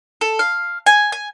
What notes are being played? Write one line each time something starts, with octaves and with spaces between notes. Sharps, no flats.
A4
F5
G#5
G#5